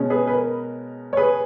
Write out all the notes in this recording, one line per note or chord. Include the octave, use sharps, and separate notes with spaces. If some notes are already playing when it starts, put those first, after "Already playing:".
Already playing: B2 G#3 C#4
G#4 B4
B4
A#4
C#5
G#4 B4